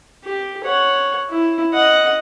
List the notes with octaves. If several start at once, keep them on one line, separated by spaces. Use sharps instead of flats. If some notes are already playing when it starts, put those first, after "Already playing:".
G4
C#5 F#5
E4
D#5 F#5